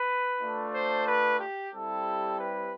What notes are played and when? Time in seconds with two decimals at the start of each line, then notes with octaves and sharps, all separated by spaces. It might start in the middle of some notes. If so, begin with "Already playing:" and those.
Already playing: B4
0.39 A3 D4 F4
0.72 C5
1.05 B4
1.38 G4
1.71 G3 C4 E4 G4 A4
2.38 B4